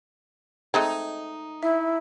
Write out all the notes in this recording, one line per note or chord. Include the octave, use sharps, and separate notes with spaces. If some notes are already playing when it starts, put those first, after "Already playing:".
G#3 A3 C4 D#4 G#6
E4 E5